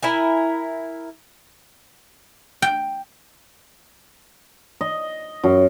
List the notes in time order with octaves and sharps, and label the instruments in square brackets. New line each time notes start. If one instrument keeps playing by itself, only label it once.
[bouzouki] E4 A#4 G#5
[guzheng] G5
[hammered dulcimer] D#5
F#2